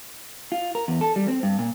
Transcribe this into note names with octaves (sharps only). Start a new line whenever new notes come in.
F4
A#4
E2
A4
G3
C4
G2
A#2